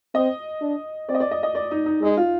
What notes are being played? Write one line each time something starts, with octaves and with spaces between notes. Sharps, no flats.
C4 D#5
D4
C4 D5
D#5
D5
D#5
D#5
D5
D#4
D#4
G#3 D#4
F4